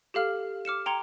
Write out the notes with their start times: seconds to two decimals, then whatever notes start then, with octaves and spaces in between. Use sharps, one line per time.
0.14 G4 A4 F5 F6
0.65 D6 F6 C#7 E7
0.86 G5 A#5 C6 G#6 C#7